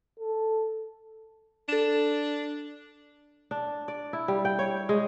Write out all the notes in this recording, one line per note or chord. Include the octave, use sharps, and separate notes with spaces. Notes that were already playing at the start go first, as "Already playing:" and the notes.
A4
D4 A4 E7
D4
D5
E4
G3
G5
C#5
G#3